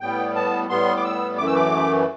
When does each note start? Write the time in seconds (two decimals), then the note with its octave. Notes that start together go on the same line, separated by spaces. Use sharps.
0.01 A2 G3 B3 G5
0.36 A5
0.69 A2 G3 B3 C6
0.97 D6
1.04 E6
1.38 F#2 E3 A3 D6
1.47 E6
1.55 D6